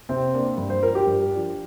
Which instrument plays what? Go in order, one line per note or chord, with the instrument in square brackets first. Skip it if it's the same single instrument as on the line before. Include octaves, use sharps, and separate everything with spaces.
[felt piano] C3 [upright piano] C4
[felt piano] A#3 D4
G2
[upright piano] C5
[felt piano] F3 D4 [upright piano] A#4
[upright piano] G4
[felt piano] G2
F3 D4